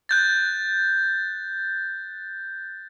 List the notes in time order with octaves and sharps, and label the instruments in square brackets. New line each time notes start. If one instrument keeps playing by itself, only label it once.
[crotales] F#6 G6 A6